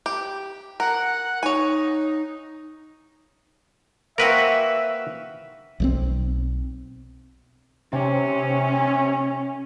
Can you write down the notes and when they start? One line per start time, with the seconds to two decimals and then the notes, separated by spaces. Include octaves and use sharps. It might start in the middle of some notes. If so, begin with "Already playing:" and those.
0.06 G4
0.80 A#4 F#5
1.43 D#4 C#5 G#5
4.18 A#3 C4 F#4 A#4 B4 E5
5.80 B1 F#3 C4
7.93 C3 C#4